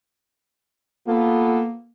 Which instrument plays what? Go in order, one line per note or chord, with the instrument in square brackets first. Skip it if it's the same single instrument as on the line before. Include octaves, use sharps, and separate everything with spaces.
[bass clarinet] A#3 [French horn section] B3 F4 A4